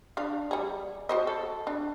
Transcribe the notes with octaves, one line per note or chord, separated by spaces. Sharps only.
D4 D5 F5
G3 G#4
F#4 C5 D#5
A4
D4